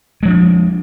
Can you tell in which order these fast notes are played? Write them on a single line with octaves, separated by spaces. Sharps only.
G#3 F3 D4